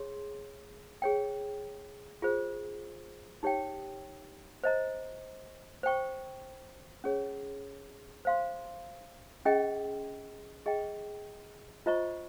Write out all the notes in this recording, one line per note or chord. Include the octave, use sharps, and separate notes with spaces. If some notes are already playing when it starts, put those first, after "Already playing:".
Already playing: G#4 C#5 C6
G#4 C#5 G5
F4 G#4 C5
D#4 G4 C#5 G5
C5 D#5 A#5
C5 G5 C#6
C#4 G#4 C#5
C5 F5 C6
C#4 G#4 D#5 G5
G#4 D#5 G5
F4 C5 D#5 A#5 C#6